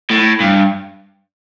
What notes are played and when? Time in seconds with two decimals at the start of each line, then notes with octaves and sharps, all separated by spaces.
0.10 A2
0.40 G2